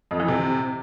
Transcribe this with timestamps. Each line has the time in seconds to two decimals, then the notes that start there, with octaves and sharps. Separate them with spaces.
0.11 F2
0.20 E3
0.28 C3